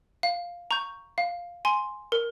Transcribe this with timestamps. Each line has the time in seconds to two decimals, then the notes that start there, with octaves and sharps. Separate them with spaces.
0.23 F5
0.71 A#5 C#6 G6
1.18 F5
1.65 G#5 C6
2.12 A#4